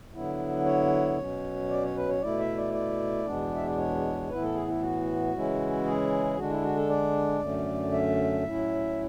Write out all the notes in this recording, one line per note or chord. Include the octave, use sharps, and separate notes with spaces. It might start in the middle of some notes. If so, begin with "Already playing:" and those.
D3 F#3 B3 E4
C#5
B2 F#3 C#4
D5
C#5
B4
C#5
B2 A3 E4 D5
E5
D5
D5
E2 B2 G#3 B3 D4
E5
D5
C#5
A2 E3 B3 E4 B4
A4
G#4
E4
F#4
C#3 E3 G#3 C#4 E4
G#4
D3 G#3 D4 F#4
E4
F#4
A4
D5
F#2 D3 A3 C#4
E5
A2 F#3 C#4 E4